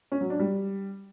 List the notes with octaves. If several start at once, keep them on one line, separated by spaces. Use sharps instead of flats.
C#4
F#3
D4
G3